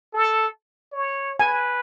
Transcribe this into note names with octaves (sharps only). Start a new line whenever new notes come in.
A4
C#5
B4 G#5